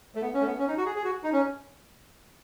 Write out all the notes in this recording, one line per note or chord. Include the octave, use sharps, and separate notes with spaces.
A3
B3
C#4
A3
B3
C#4
D#4
F#4
G#4
G#4
F#4
D#4
C#4